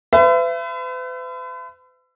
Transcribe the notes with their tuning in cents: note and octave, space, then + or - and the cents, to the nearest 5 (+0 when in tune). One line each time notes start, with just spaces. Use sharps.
B4 +45 E5 +35